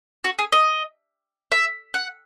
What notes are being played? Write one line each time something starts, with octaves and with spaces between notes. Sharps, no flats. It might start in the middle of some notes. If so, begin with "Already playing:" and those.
F#4
G#4
D#5
E5
F#5